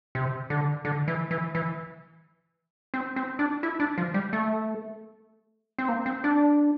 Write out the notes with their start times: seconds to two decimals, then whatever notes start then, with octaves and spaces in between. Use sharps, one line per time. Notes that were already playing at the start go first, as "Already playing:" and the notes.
0.15 C3
0.50 D3
0.85 D3
1.08 E3
1.31 E3
1.55 E3
2.94 C4
3.16 C4
3.39 D4
3.63 E4
3.80 D4
3.98 F3
4.14 G3
4.33 A3
5.79 C4
5.89 A#3
6.06 C4
6.24 D4